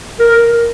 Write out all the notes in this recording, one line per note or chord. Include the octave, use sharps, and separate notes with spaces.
A#4